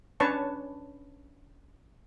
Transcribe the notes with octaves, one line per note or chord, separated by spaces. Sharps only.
C#4 D4 B4 C#5 A5 C#6